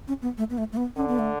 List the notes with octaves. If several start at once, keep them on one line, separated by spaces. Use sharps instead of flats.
C#4
B3
A3
B3
A3
A3
B3
D3 C#4
B3
A3